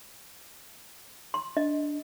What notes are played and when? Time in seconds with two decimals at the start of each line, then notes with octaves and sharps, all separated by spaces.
1.34 C6
1.57 D4 D#5